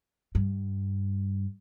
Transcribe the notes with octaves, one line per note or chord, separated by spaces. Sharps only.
G2